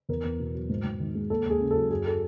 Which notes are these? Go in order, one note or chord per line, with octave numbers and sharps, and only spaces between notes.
E2 A#4
E2
B2
F#3
G#2
G#2
D#3
G#3
D#2 A4
D#2 G#4
C#3
F#3 A4
F#2 G#4
A4